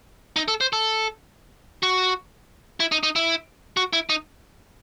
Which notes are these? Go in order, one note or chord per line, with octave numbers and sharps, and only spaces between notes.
D#4
A4
C5
A4
F#4
E4
D#4
D#4
E4
F#4
E4
D#4